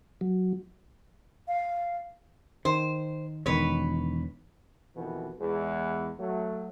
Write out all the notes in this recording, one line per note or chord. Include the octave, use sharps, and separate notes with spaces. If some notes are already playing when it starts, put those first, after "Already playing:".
F#3
F5
D#3 C5
E1 D#3 B4 C#5
F2 B2 D#3 E3
E2 G#3
F#3 A3